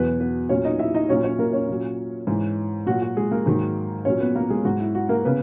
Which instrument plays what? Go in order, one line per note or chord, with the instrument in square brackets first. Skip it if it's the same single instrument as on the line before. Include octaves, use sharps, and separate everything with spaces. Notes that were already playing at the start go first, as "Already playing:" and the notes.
Already playing: [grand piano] E2 B2 F#3 B3 B4
B3 B4
A#2 F#3 C#4 C#5
D#4 D#5
E4 E5
D#4 D#5
A#2 F#3 C#4 C#5
C#4 C#5
A#3 A#4
C#4 C#5
A#2 F#3
G#2 E3
A#2 F#3 F#4
F#4
G#3 G#4
A#3 A#4
G#2 D#3 F#3
A#2 F#3 C#4 C#5
B3 B4
A#3 A#4
G#3 G#4
G#2 F#3 F#4
E4
F#4
A#3 A#4
C#3 B3 B4